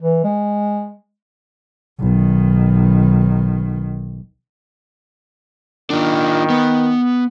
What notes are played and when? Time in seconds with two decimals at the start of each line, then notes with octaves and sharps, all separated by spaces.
0.01 E3
0.24 G#3
1.99 B1 D#3
5.90 D#3 D4 F4
6.50 B3